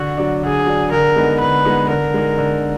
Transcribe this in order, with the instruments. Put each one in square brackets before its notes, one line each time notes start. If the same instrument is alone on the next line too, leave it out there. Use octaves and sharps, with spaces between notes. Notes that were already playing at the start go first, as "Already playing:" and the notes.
Already playing: [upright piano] D3 [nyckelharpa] F#4
[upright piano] F#3 D4
[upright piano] D3 [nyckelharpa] G#4
[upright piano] F#3 D4
[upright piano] D3 [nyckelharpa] A#4
[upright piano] G#3 B3 D#4
[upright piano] D3 [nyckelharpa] B4
[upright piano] G#3 B3 D#4
[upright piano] D3 [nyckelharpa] A#4
[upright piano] G#3 D#4
D3